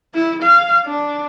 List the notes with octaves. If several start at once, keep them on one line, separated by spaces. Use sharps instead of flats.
E4
F5
D4